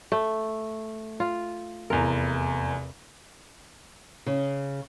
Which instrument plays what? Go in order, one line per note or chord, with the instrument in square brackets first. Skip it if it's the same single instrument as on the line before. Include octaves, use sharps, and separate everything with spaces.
[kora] A3
F4
[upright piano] F1 E2 [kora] A#4
[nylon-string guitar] C#3